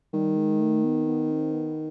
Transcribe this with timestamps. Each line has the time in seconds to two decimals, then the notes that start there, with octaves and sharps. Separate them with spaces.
0.13 D#3 G3
0.37 G#3
0.60 A3
0.84 B3
1.07 B3
1.31 C4
1.54 B3